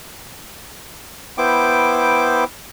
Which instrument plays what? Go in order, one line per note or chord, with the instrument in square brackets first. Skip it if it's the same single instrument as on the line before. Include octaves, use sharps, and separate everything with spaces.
[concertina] B3 E4 C5 G5 D6